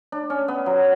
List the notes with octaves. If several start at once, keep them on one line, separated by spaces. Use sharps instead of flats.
D4
C#4
B3
F#3